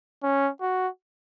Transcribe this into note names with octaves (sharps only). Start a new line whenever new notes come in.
C#4
F#4